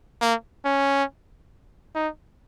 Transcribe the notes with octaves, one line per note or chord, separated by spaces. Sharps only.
A#3
C#4
D#4